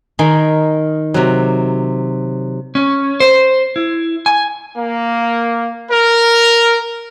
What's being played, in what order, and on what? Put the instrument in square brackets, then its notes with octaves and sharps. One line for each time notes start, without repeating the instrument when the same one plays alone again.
[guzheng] D#3 A#4 G#5 C6
C3 F#3
[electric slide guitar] C#4
C5
E4
G#5
[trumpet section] A#3
A#4